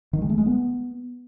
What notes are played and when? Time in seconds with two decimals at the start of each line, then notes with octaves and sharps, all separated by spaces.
0.13 D#3
0.21 G#3
0.30 A3
0.38 G#3
0.46 B3